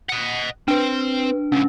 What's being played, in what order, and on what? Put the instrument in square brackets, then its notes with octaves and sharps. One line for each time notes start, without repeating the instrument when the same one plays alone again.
[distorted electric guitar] D#5 F#5
[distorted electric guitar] C4 [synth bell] D4 B4
[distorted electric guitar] C#2 A2 [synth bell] C#4